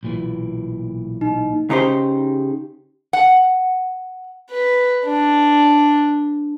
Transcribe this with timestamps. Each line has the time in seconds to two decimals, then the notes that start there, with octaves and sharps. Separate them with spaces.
0.03 B1 A#2 E3
1.21 D#4
1.70 C#3 D#4 G4 C5
3.13 F#5
4.51 B4
5.05 D4